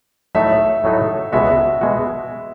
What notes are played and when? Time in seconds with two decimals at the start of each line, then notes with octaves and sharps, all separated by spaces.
0.35 A2 F#3 A3 D#4 A4 E5
0.84 A2 F#3 A3 D#4 A4
1.32 C#2 B2 G#3 B3 F#4 E5
1.81 B2 G#3 B3 F#4